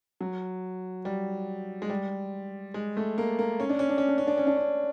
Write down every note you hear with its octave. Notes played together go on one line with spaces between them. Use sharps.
F#3
G3
G#3
G3
G#3
A3
A#3
A#3
C#4
D4
C#4
D4
C#4
D4
C#4
D4
C#4
D4
C#4